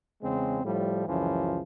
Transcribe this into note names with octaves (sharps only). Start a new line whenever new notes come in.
E2 C#3 G#3 C4
A2 F3 G3
C#2 F#2 E3 F3